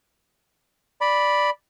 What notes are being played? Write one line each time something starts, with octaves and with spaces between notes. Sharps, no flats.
D5 B5